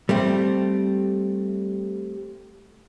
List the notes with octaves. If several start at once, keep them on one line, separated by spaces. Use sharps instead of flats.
G3 A3 C4